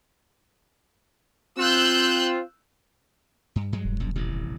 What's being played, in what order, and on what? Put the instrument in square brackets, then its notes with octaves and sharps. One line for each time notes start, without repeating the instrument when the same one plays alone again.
[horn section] C4 F4 [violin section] E6 F#6 G6
[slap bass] G2
G2 F#3 G#3
[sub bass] E1
[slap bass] A#1 F#2
D#1 A1 C3